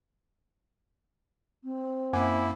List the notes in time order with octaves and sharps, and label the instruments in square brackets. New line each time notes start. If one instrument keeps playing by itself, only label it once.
[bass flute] C4
[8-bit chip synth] F#2 A#3 [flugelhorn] E4 [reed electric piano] F#5 G#5 D6